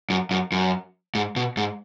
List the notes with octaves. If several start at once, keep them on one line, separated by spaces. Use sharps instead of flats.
F#2
F#2
F#2
G#2
B2
G#2